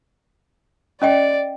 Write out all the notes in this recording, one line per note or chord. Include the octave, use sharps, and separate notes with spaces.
C#4 D5 D#5 G5